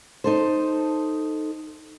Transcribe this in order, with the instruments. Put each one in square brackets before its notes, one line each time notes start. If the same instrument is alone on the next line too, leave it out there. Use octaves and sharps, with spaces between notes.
[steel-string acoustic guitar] D#4 A4 C5